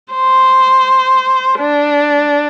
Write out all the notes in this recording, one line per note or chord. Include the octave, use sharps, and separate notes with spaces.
C5
D4